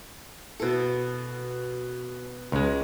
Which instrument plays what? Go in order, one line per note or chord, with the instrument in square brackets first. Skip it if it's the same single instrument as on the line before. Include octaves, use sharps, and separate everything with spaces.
[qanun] B2 A4
[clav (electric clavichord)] C#2 G#3